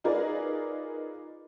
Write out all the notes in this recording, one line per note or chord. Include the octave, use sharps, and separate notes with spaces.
D#4 F4 G#4 A#4 B4 D5